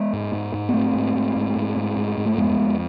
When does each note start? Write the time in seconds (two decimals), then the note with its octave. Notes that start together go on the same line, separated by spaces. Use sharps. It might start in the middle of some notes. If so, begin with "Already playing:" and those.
Already playing: G#3 B3
0.13 G#2
0.33 G#2
0.54 G#2
0.69 B3
0.74 G#2 A3 C4
0.94 G#2
1.15 G#2
1.36 G#2
1.56 G#2
1.76 G#2
1.97 G#2
2.18 G#2
2.26 A3
2.38 F2 G#3 B3
2.59 F2